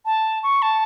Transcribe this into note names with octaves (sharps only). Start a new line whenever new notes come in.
A5
C#6
A5